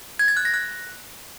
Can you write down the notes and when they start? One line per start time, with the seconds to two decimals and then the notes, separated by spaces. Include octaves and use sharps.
0.19 G#6
0.28 A6
0.37 F#6
0.45 A#6
0.54 F#6